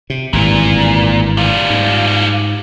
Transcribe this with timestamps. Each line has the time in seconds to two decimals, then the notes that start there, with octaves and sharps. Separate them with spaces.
0.10 C3
0.33 G#1 G2 A#2 E3
1.37 G3 F4
1.70 G#2